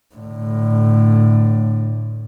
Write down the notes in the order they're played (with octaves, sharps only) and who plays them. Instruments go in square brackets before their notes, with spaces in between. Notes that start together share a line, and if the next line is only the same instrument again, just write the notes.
[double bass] A2 D3